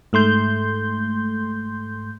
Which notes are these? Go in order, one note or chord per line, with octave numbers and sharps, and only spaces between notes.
G#2 A3 C6 G6